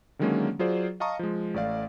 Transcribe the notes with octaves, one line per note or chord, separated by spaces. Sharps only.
D3 D#3 F#3 G#3 A#3 C#4
F#3 F4 G#4 C5 D5
D#5 F5 A5 A#5 C#6 D#6
F3 G#3
A1 A3 D5 F5